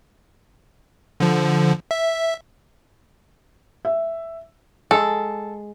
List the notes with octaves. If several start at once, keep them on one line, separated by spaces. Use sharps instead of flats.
D3 F3
E5
E5
G#3 A4